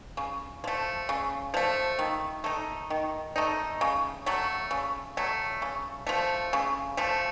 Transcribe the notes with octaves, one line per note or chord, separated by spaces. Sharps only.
C#3
F3 A3
C#3
F3 A3
D#3
A3 D#4
D#3
A3 D#4
C#3
F#3 A3
C#3
F#3 A3
C#3
F3 A3
C#3
F3 A3